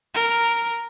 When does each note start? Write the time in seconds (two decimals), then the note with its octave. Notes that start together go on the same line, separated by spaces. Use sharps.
0.14 A#4